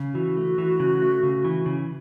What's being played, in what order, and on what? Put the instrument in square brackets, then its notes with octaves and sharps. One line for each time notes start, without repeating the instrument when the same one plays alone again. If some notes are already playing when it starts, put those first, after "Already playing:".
Already playing: [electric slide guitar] C#3
[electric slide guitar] E3 [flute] F#4
[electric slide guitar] A3
E3
C#3
A3
C#3
E3
C#3